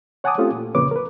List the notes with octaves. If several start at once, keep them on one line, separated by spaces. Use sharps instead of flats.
C#5 F#5 G#5 A5 D6 D#6
A3 C4 C#4 F4 G4 A4
A#2
F2 A#2 C#3 B4 C#5 D6
A#4 B4